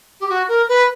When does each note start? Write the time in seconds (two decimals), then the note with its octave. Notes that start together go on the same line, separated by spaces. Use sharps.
0.20 G4
0.29 F#4
0.48 A#4
0.68 B4